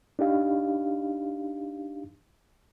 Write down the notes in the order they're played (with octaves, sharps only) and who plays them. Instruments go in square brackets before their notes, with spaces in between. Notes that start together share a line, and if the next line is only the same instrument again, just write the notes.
[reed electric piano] D4 D#4 G4 F5